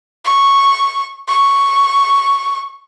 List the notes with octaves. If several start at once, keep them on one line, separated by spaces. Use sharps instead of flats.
C#6
C#6